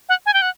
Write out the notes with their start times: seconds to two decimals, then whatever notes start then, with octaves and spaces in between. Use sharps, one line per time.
0.09 F#5
0.26 G#5
0.34 G5
0.42 F#5